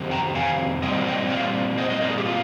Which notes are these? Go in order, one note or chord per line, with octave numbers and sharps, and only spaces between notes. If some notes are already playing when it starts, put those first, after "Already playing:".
Already playing: F2 C3 D#3
G5 A#5
F5 G#5
A#2 G3 C4 D#5 G5
D#5 G5
D5 F5
C5 D#5
D#5
A#4 D5
G#4
G4
F4